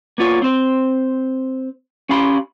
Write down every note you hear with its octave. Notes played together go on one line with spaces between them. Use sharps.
A#3 B3 F4 C#5
C4 C5
C#4 G4 F5 B5 C6